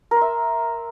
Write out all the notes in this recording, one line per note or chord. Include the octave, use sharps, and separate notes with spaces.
A#4
C6
E5